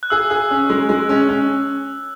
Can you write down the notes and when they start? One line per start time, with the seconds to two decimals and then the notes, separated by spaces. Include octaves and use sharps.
0.03 F#6
0.10 G#4 E6
0.30 G#4
0.51 C#4
0.70 G#3
0.89 G#3
1.09 C#4
1.29 C#4